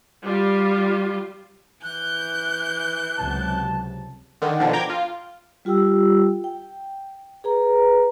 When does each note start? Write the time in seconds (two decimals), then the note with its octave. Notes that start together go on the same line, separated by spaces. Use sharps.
0.22 G3 F4
1.83 E3 F#6 G6
3.19 C#2 C3 F#3 A5
4.42 D3 D#3
4.60 B2 D3 D#3 F3 D4
4.73 G5 A#5 D6 G6 G#6
4.90 F4
5.65 G3 F4 G4 G5 E6
6.44 G5
7.44 G#4 B4 A#5